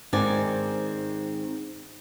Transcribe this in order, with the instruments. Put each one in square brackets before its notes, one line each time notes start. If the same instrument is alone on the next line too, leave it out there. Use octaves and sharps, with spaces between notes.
[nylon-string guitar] G#2 D#3 C4 D5 G#5